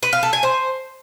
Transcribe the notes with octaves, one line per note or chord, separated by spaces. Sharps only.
B4
F5
A4
G#5
C5